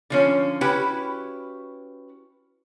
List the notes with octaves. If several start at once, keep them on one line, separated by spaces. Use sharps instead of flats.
D3 F3 C#4
C#4 E4 F#4 G4 B4 G5